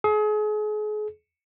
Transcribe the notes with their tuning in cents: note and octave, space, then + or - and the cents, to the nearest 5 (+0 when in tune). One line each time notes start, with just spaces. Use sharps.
G#4 +35